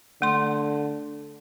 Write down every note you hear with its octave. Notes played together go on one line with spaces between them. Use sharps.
D3 A3 C6